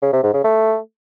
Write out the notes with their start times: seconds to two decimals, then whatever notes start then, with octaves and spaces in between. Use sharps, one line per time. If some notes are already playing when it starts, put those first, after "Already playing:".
0.03 C#3
0.13 C3
0.23 G#2
0.34 C#3
0.44 A3